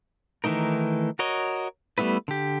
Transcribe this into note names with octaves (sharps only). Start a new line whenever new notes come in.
D#3 E3 A3 D#4 A#4
F#4 A#4 C#5 D#5
G3 A3 B3 E4 B4
D3 G4